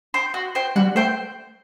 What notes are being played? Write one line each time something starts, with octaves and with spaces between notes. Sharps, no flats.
C5 G5
F#4
C5 G5
G3 F#4
A3 C5 G5